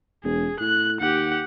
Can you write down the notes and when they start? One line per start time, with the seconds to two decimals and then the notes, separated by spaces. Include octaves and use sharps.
0.24 E1 G#4
0.60 A2 F#6
1.00 D#2 G4 F#5